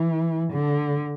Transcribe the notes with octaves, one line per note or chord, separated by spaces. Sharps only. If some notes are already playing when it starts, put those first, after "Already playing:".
Already playing: E3
D3